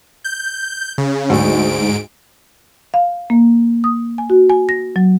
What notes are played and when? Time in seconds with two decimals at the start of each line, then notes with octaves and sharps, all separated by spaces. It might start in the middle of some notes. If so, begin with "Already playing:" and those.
0.24 G6
0.98 C#3
1.30 D2 G#2 F#3 D7
2.94 F5
3.30 A#3
3.84 D#6
4.18 G#5
4.30 F#4
4.50 G#5
4.69 A#6
4.96 F#3